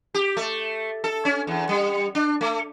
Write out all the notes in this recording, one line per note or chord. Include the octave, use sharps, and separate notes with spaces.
G4
A3
A4
C#4
E2
G3
D4
A3